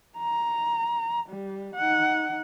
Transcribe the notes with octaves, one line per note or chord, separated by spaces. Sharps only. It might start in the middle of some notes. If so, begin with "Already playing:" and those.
A#5
G3
D#4 F#5